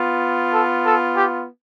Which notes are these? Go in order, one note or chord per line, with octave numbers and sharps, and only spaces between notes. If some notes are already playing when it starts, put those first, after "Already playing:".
Already playing: B3 F4
A4
A4
G4